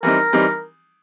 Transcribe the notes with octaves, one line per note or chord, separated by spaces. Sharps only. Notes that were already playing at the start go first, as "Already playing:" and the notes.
E3 G3 C4 D#4 A#4
E3 G3 C4 D#4